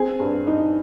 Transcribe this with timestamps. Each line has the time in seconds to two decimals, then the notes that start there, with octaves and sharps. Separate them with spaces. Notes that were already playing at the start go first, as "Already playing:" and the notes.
Already playing: C4 G#4 G#5
0.20 G2
0.47 D#4